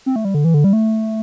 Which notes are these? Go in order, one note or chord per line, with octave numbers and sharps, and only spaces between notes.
C4
A3
G3
D3
E3
D3
G3
A3